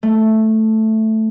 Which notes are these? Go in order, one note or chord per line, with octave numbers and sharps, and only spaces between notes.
A3